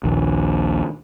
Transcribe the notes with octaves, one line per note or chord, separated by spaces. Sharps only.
A#1 D#2